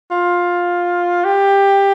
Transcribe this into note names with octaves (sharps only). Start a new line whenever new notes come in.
F4
G4